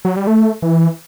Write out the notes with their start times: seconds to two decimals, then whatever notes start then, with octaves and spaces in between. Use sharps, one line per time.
0.05 F#3
0.17 G3
0.27 A3
0.62 E3